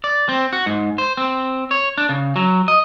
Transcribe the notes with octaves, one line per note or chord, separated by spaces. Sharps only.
D5
C4
F#4
G#2
C5
C4
C#5
D4
C#3
F#3
D#5